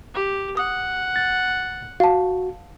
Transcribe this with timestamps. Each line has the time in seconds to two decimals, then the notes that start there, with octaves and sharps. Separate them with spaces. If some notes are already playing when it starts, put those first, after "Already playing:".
0.14 G4
0.57 F#5 D#6
1.16 A6
2.00 F#4 F5 A5